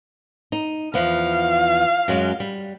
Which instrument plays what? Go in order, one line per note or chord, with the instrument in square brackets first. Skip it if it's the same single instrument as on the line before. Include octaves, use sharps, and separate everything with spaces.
[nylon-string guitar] D#4
[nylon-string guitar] E2 F3 B3 [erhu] F5
[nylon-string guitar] F#2 F#3 G#3
G3